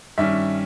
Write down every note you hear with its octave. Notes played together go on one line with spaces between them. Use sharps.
G2 D#3 G3 C#4 E5